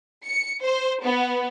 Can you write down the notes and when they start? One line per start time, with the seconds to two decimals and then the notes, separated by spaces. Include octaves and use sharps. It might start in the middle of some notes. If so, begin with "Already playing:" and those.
0.25 C#7
0.63 C5
1.03 B3